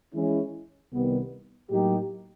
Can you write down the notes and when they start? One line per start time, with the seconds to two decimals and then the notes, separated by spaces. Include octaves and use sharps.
0.13 E3 G#3 C#4 E4
0.92 C2 C3 D#3 G3 B3
1.70 A2 F#3 A#3 D#4 G4